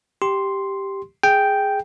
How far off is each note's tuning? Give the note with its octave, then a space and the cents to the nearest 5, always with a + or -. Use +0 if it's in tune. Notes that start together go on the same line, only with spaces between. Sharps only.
G4 +0 C6 +0
G#4 +0 G5 +0